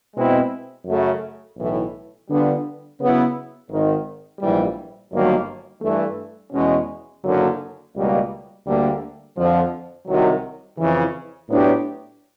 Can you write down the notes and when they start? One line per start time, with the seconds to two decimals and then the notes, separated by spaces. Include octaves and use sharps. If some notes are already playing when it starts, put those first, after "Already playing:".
0.15 B2 G#3 C4 E4
0.86 F#2 C#3 F#3 A3
1.57 B1 A2 E3
2.29 D3 G3 B3 D4 F4
2.99 C#3 F#3 B3 E4
3.69 G#1 G#2 D#3
4.40 A#1 G#2 E3 G3
5.11 G1 G2 D#3 F#3 A#3
5.82 G2 E3 A3
6.52 E2 B2 G#3 C#4
7.24 F#1 F#2 D3 F#3 A#3
7.95 C#2 B2 G3 A#3
8.66 D2 D3 G3 A#3
9.36 F2 D3 F3
10.07 C2 C3 D#3 F#3
10.78 F2 C#3 E3
11.48 A2 F#3 B3 D4 G4